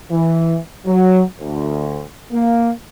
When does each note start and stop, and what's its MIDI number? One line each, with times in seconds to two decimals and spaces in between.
0.11 0.57 52
0.86 1.21 54
1.39 2.02 38
2.31 2.69 58